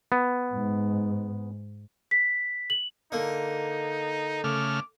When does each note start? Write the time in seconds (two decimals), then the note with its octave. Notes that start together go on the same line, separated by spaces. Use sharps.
0.12 B3
0.52 G#2
2.11 B6
2.70 F#7
3.12 D3 A#3 D#4
4.44 C#3 A3 D6 F6